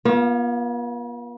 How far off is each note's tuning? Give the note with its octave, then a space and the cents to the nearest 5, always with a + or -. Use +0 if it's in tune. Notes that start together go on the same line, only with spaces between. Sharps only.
B3 -45 F4 +0